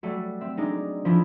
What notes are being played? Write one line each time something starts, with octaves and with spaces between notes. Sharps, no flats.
F#3 G3 A3 F#4
C4 E5
G#3 D4 D#4 D5
F3 G#3 A3 D4 E4 F4